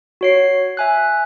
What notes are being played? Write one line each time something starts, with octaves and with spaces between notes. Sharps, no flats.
F#4 C#5 C7
E5 G#5 F#6